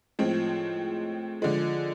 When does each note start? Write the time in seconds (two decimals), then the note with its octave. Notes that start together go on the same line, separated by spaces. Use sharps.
0.19 A2 F3 G#3 C4
1.42 D3 F3 G#3